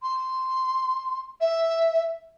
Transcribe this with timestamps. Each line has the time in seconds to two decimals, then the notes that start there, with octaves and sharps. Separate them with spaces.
0.02 C6
1.40 E5